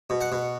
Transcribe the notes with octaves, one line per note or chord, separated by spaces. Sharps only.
B2
F#5
B2